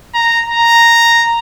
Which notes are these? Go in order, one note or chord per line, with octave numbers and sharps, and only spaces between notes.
A#5
A#5